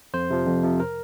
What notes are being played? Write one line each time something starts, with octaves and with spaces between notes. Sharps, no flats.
F2 C5
C3 F3
F2
C3 F3
A#4